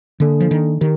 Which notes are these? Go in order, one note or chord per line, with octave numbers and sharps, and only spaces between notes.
D3 A#3 D4 A4
F3
D#3
D#3 G4 A#4